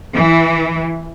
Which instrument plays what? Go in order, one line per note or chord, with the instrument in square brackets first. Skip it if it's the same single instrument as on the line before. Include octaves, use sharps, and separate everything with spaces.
[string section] E3